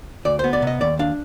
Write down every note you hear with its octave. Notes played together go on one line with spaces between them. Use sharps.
D2 D5
C5
B3
D5
C3 D#5
D#2 D5
D4 F5